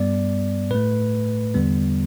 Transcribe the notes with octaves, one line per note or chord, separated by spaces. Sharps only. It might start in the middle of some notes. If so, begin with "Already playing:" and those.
Already playing: G2 G3 B3 D5
A2 A3 B4
E2 D3 G3 B3